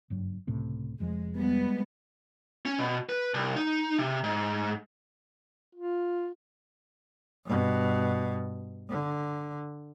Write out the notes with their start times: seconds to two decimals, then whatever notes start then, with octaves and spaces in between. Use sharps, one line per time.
0.10 F#1 G2 F#3
0.47 C#2 A2 C3
1.00 F1 F2 F3 G#3
1.37 G3 G#3 B3
2.65 C#4
2.79 B2
3.09 B4
3.34 C2
3.56 D#4
3.98 C3
4.24 G#2
5.75 F4
7.46 G2 B2
8.89 D3